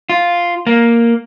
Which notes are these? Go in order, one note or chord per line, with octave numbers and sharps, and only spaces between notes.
F4
A#3